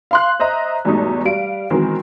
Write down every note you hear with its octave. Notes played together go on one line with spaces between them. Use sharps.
F5 C6 F#6
C5 D#5 E5 A#5
E2 G#2 B2 G3 A3 D#4
G3 F5 D7
B2 D#3 E3 F#3 G#3 C4